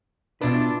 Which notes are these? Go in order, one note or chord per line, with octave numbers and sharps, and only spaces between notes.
B2 D4 E4 F4 B4